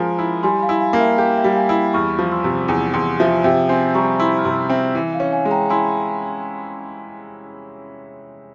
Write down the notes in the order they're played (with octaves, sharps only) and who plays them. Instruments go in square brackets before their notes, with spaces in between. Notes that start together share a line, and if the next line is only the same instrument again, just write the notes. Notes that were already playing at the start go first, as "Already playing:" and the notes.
Already playing: [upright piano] F3 G#3 A#4 [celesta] G#5 A#5 C6
[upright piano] E4
[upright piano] G3 [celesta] G#5 C6
[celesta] F5 G#5
[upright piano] E4
[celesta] F5 G#5
[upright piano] A#3
[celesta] E5 G5
[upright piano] G4 [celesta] F5
[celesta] E5 G5
[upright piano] G3
[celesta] F5 G#5
[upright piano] E4
[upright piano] E2 [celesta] C#6 F6
[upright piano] F3
[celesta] C6 E6
[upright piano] C3
E2
[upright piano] E2 [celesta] G#5 C6
[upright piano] F3 [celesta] E5
[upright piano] C3 [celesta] E5 G5
[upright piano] C4 [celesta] G#5 C6
[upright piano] G3 [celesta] A#5 C#6
[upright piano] E4 [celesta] C6 E6
[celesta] F6
[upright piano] C3 [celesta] C6 E6
[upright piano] C4 [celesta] E5 G5
[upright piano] E3 [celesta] E5
[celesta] F5
[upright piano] C#4
[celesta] F5 G#5
[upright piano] G#3
[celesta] G5 A#5
[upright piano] E4 [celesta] G#5 C6